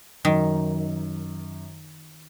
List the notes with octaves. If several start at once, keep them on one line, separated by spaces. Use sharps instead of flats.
F#2 D#3